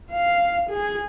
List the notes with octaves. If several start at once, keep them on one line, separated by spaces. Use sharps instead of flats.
F5
G#4